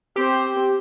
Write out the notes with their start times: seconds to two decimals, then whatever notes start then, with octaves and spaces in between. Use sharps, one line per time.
0.16 C4 G4 C5